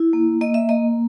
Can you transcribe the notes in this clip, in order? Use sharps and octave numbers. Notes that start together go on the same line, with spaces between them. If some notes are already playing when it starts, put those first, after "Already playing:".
Already playing: E4
A#3
A#3 D#5
E5
A#3 D#5